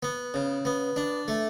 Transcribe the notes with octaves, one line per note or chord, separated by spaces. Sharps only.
B3
C#3
B3
D4
A3